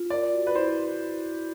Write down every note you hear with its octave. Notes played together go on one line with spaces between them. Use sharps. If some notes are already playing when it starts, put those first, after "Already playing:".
Already playing: F4
A#4 D5
F#4
B4
E4 C5